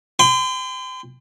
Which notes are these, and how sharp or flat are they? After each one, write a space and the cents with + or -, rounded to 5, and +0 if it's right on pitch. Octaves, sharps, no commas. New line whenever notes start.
G5 +35 C6 -40